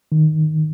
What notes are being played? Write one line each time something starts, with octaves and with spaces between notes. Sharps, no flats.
D#3